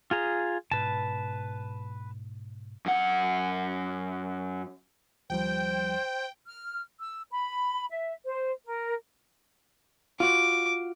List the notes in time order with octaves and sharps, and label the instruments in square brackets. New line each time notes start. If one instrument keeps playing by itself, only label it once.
[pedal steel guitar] F4 G#4 A#5
[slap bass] G#2 B2 [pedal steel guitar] B4 A5
[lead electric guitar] F#2 F#5
[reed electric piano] D#2 F3 G3 [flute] C5 [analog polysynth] G5
[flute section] F6
E6
B5
E5
C5
A#4
[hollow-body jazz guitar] F4 F#4 [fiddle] D6